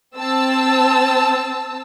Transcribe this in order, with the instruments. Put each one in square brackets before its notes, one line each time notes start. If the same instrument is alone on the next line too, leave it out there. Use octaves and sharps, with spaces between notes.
[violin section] C4 A5 E6